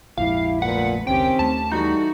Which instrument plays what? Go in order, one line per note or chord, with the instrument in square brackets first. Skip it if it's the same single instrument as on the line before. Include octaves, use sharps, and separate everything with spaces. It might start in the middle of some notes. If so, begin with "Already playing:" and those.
[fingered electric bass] A#1 F2 G#2 [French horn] E4 [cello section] G4 [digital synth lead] F5
[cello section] D2 B4 [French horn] A#2 [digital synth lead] F#5
[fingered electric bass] F1 C#2 [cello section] D#3 C#4 G4 [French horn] C4 [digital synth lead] G5
[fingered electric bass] D#2 A3 [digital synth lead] A5
[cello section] E3 F#4 A4 [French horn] G3 [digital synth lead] D#4